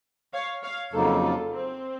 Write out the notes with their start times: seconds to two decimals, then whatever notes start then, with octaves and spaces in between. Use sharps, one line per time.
0.33 C#5 F5
0.63 C#5 F5
0.93 F2 C#3 F#3 A#3 D#4 A4 C5
1.22 F4 A4
1.51 C4